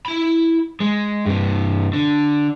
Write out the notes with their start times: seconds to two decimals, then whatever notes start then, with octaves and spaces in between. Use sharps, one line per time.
0.06 E4 B5
0.80 G#3
1.26 G2 C3
1.93 D3